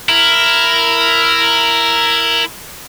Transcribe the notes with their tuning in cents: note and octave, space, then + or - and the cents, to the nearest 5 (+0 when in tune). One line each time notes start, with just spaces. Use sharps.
E4 +10 A#4 +0